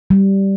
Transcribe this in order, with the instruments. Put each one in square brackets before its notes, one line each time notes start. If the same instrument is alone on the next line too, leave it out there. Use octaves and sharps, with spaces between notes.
[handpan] G3